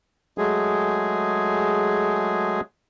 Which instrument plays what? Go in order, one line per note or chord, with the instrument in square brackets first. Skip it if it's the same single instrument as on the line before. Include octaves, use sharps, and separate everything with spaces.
[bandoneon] F#3 G#3 A3 G#4